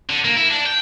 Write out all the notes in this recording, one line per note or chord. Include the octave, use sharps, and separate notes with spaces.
D3
A#3
E4
D4
G5